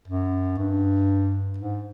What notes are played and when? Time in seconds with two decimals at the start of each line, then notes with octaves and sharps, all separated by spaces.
0.08 F#2
0.58 G2
1.58 G#2